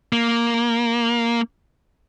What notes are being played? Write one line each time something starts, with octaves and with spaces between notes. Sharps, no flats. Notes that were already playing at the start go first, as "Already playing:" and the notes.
A#3